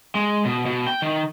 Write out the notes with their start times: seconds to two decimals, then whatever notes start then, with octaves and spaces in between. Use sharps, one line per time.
0.15 G#3
0.45 B2
0.66 B2
0.86 G5
1.02 D#3